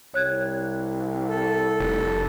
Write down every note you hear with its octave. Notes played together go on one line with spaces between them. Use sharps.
C2 C#5 F#6 G#6
A4
F1